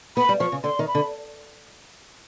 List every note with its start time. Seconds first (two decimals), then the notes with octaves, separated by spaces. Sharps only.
0.17 B3 B5
0.29 G3
0.40 F3 C#6
0.52 C#3
0.63 D3 C6
0.79 D#3
0.88 B5
0.95 D3